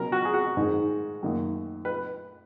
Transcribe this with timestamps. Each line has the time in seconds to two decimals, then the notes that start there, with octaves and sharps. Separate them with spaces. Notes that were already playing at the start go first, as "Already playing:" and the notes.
Already playing: B2 F#3 C#4 A#4
0.12 F#4
0.25 G#4
0.34 F#4
0.57 G#2 D#3 G#3 D#4
1.23 F#2 D#3 A#3
1.85 B4